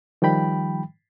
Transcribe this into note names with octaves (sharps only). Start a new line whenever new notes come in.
D#3 F3 G3 G5 B5